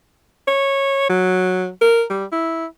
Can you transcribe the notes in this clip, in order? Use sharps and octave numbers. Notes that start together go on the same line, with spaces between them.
C#5
F#3
A#4
G3
E4